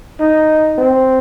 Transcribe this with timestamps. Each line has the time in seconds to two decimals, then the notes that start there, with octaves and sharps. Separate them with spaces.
0.20 D#4
0.78 C4